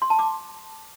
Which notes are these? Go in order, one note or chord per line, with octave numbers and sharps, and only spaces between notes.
C6
A5
D6